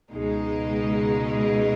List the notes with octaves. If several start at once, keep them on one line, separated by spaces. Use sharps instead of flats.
C#2 B2 G#3 D#4